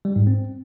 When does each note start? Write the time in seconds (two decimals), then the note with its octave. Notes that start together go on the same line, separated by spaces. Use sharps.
0.05 G3
0.16 G#2
0.27 C4